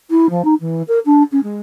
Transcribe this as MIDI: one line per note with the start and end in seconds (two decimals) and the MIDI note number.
0.10 0.29 64
0.29 0.44 53
0.44 0.54 63
0.60 0.82 52
0.88 0.99 70
1.05 1.23 62
1.32 1.40 61
1.43 1.61 56